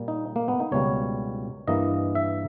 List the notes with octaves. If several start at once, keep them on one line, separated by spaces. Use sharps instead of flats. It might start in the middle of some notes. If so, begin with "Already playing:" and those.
Already playing: A#2 G3 A#3
D#4
A#3
B3
D#4
C#2 B2 G3 A#3 C#5
G2 E3 A#3 D#5
E5